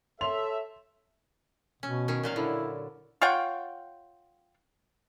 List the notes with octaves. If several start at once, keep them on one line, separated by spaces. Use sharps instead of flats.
A4 C#5 E5 C6 F7
B2 C#4
D#3 C#4
A#2 F#3 F5
D3 E4
F4 C#5 F#5 G5